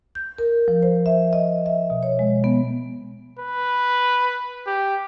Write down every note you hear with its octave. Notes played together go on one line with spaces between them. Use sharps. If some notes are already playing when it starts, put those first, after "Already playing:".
G6
A#4
F3
C5
E5
D#5
E5
B2
C#5
G#3
B3
B4
G4